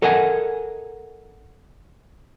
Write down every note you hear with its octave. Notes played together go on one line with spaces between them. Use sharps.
A4 A#4 D#5 F#5 G#5